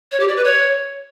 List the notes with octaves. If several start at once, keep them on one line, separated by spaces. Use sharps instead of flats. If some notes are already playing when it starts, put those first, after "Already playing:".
C#5
G4
D5
B4
C#5